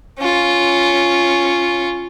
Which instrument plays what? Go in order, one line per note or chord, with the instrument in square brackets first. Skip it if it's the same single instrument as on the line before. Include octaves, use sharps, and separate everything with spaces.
[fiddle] C#4 F4